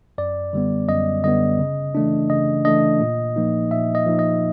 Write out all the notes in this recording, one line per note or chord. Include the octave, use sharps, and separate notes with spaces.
F#2 D5
D3 G3 B3
F#2 D#5
D3 G3 B3 D#5
C#3
E3 A3 D4
C#3 D#5
E3 A3 D4 D#5
A#2
F3 A#3 D#4
A#2 E5
D#5
F3 A#3 D#4
D#5